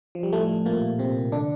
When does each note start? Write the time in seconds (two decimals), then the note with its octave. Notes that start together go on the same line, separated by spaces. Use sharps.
0.15 F3
0.23 G3
0.33 A2 A3
0.66 A#2 A#3
0.99 C3 C4
1.32 D3 D4